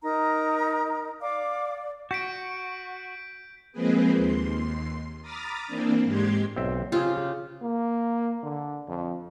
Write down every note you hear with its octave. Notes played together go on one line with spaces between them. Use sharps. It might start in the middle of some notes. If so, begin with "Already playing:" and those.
D#4 A#4 A#5
D5 F5 D6
F#4 G6 B6 D7
F3 G#3 A#3 C4 G#4 B4
D#2 C6
A#5 B5 D6 D#6 F6 A6
E3 A#3 C4 D4
G#2 G#3 G4 C6 G#6
B1 C4 E5
C#3 C4 F4 G4 G#4
A#3
D3
F2